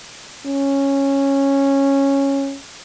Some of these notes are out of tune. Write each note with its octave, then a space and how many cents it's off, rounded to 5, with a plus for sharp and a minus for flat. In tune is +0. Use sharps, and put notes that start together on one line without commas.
C#4 -10